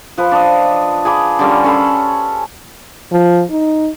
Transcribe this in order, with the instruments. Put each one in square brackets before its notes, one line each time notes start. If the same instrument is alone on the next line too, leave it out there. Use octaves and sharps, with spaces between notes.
[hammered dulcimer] F3 B4
D4 D#5
G#4 B5 D6
D3 G3 C#4 A#4
C#4 A4 B5 C6
[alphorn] F3
D#4